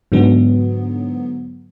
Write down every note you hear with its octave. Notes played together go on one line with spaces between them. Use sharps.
G#2 D3 F#3 B3